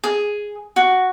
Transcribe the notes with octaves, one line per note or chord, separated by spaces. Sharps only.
G#4
F#4